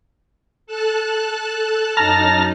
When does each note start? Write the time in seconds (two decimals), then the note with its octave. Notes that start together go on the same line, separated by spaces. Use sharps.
0.67 A4 A5 F#6
1.97 F#2 D#4 A5 A#5 F6